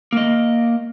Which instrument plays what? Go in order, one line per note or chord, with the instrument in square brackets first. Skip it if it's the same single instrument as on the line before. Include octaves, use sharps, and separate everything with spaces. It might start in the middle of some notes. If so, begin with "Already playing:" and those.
[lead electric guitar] A#3 D#5